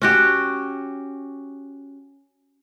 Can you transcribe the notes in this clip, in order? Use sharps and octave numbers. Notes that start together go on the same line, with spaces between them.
C#4 F#4 G4